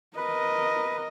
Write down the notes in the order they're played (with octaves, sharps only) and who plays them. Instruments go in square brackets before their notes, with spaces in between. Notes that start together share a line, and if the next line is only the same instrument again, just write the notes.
[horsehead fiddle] A#4 D#5 [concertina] B4